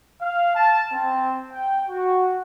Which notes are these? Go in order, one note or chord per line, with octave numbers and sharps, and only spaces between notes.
F5
A5
C4
G5
F#4